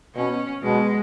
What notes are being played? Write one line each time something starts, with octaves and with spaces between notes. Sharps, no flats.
B2 C#4
B2 G#3